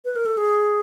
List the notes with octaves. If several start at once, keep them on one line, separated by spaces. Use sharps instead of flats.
B4
A#4
A4
G#4